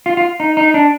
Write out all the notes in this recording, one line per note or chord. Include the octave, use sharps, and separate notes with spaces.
F4
F4
D#4
D#4
D4